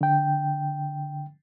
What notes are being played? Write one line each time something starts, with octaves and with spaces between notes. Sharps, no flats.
D3 G5